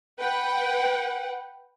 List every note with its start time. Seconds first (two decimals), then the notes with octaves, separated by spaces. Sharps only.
0.20 B4 F#5 G5